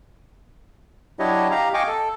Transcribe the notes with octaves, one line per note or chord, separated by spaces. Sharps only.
F#3 D4 E4 G4 C#5 D#5
G4 F5 A#5
D#5 F5 G5 G#5 C#6 D6
A4